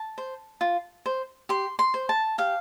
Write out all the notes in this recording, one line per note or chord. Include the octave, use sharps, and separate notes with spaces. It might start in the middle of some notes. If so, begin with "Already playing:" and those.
Already playing: A5
C5
F4
C5
G4 C6
C6
C5
A5
G4 F5